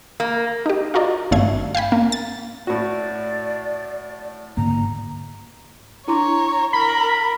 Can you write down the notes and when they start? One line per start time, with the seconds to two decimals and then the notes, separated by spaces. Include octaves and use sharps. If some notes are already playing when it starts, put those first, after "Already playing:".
0.20 A#3
0.66 D#4 G4
0.94 F4 F#4 A#4 D5 D#5
1.31 G#1 G2 A3 F5 G#6
1.75 F5 G5 G#5 B5
1.92 A#3
2.12 A6
2.67 A2 F#4 D5
4.57 G#2 D3 A#3 A#5
6.08 D4 E4 C#5 A#5 C6
6.73 A#4 B5